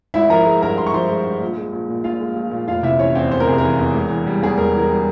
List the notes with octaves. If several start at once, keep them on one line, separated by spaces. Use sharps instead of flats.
G#1 E4 E5
F3 A#4 A#5
G#3
G2 A#4 A#5
G#1 C6
C#6
F3 C5 C6
G#3
G2
A#1
G#3
A#1
A#2
A#1 F4 F5
G#3
A#1
A#2
F1 F4 F5
C3 E4 E5
E3 C#4 C#5
E2 C4 C5
F1 C5
A#4
C3 G#4
E3 A#4
E2
E1
E3
G3
E2 G#4
E1 A#4
E3 A#4
G3